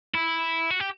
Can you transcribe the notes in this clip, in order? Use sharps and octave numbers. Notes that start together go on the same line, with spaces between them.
E4
F#4
G4